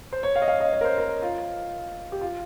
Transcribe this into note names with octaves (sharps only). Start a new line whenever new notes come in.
C5
C#5
F5
D#5
F5
D#5
C#5
A#4
C5
A#4
F4
G4
F4